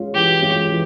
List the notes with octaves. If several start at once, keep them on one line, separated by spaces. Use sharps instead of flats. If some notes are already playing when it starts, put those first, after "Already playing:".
Already playing: G#3 C#4 F4
E3 G4
G#3 C#4 F4
E3